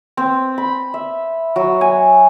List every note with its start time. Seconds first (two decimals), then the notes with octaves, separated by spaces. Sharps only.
0.17 C4
0.58 B5
0.94 E5
1.56 F#3
1.81 G#5